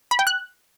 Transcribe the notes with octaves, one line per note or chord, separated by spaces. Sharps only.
B5
G5
F#6